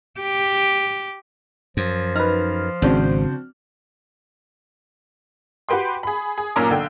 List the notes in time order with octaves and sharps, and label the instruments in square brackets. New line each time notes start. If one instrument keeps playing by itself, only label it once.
[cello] G4
[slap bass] F#2 [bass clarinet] F3
[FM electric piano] D#4 B4 [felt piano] F6
[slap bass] G#1 [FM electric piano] C#3 G6 [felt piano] C4 D4 F#4
[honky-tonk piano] F#4 G4 B4 G5 C6
G#4 B5
G#4
B1 A#2 C#4 A#4 A#5 D6
B1 D3 G5